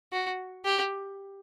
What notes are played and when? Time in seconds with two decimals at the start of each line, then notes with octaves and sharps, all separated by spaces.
0.13 F#4
0.65 G4